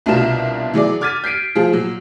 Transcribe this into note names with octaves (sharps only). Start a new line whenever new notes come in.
C2 B2 D4 F4 A#4 E7
E3 F#3 G#4 D5
D6 F6 G#6 A6 B6 D#7
G6 B6 C7 D7 D#7
F3 F4 G#4
A#2 F#3